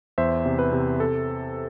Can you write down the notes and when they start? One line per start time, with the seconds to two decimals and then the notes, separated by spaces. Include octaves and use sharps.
0.18 E2 C5 E5
0.46 C3
0.59 B4
0.73 C3
1.00 A4